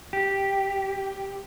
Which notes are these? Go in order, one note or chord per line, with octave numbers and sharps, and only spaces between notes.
G4